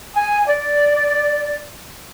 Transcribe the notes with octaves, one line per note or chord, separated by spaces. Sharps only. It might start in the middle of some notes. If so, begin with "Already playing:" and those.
G#5
D5